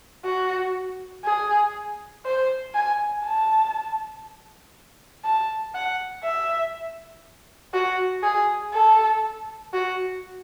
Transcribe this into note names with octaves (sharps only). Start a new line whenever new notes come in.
F#4
G#4
C5
G#5
A5
A5
F#5
E5
F#4
G#4
A4
F#4